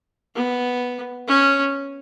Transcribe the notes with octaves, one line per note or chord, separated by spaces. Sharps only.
B3
C#4